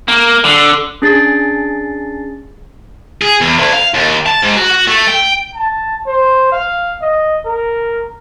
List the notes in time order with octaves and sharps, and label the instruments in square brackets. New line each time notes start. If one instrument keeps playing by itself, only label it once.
[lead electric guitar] A#3
D3
[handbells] C#4 D4 G#4 A6 C7
[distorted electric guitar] G#4
E2
D2
F5
D#2
A5
G#2
F#4
F#4
A3
G5
[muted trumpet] A5
C5
F5
D#5
A#4